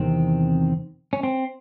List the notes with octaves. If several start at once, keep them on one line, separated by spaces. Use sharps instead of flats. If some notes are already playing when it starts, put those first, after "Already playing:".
Already playing: E2 C3 D#3 C4
C#4
C4